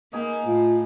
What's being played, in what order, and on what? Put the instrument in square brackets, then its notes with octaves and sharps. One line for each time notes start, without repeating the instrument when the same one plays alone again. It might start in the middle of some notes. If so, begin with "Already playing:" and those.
[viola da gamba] A#3 [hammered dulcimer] D#4 G#4 B5
[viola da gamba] A2 [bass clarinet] F4